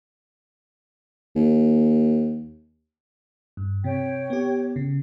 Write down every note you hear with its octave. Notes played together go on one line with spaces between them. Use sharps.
D#2
G2
C3 C#5 G5
B3 G4
C#3